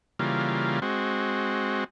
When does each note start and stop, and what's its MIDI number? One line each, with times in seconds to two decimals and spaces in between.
0.19 0.80 49
0.19 0.80 52
0.19 0.80 55
0.19 0.80 58
0.19 0.80 65
0.82 1.84 56
0.82 1.84 60
0.82 1.84 66